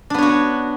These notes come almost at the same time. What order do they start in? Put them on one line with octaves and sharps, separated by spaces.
D4 B3 C#5 F#4